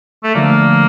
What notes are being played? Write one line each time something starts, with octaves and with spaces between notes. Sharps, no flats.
A3
D3 F3 A3 A#3